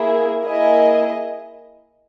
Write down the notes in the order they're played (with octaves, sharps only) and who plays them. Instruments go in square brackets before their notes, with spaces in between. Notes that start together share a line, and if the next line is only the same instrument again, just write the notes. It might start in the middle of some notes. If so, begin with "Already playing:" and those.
Already playing: [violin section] A#3 E4 G#4
A#3 E4 G#4 D#5